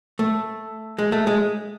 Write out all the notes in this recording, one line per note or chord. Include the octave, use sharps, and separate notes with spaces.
A3
G#3
A3
G#3